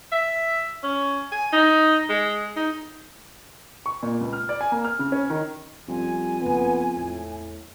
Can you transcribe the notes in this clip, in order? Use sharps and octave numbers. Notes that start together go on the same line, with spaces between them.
E5
C#4
G#5
D#4
G#3
D#4
C#6
A#2
C#2
F6
D5
G#5
A#3
F6
C#3
C#4
D#3
G1 F2 G3 C#4 G#5
F#1 C#3 B3
E2 A2 A3